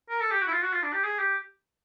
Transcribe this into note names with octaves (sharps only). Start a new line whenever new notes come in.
A#4
A4
G4
F#4
E4
F4
F#4
F4
D4
G4
G#4
G4